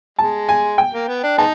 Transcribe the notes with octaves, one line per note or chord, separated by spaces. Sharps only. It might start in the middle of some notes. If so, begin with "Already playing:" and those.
G#3 A5
G#5
G5
A#3
B3
D4
G#3 B3 D#4 A5